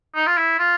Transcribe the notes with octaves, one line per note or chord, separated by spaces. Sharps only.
D#4
F4
E4
F4